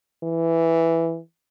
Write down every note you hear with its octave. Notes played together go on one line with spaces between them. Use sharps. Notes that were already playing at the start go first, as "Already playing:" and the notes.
E3